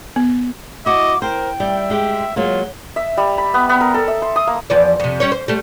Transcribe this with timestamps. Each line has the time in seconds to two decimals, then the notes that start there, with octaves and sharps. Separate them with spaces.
0.16 B3
0.86 E4 F#4 D#5 D6
1.22 A#4 C5 G5
1.60 G3 E5
1.90 G#3 G4
2.36 F#3 G#3 A#3 F4
2.96 E5
3.17 G3
3.38 B5
3.54 B3
3.69 B3
3.81 A#4
3.94 A4
4.08 E5
4.22 C6
4.36 D#6
4.47 A#3
4.70 E2 F3 D5
5.00 F2 C3
5.20 G3 C#4 C#5
5.32 C5
5.48 G3 A3